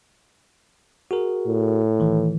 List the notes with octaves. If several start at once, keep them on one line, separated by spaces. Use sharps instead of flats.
F#4 G#4 A#4
A2
D#3 E3